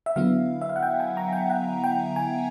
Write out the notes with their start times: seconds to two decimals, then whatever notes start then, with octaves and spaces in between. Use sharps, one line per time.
0.06 E5
0.16 D3 F#3 B3 E4 F5
0.61 E5
0.69 F5
0.76 F#5
0.83 G5
1.00 G#5
1.17 A#5
1.33 G5
1.50 F#5
1.84 G5
2.16 G#5